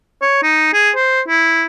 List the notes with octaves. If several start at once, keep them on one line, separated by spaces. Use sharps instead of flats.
C#5
D#4
G#4
C5
E4